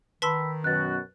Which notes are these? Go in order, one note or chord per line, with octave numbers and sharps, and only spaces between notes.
D#3 B4 A5 B5 C6 E6 B6
F#2 B2 F#4 F#6 A6